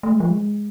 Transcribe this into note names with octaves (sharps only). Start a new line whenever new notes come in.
A3
G#3
F3
G#3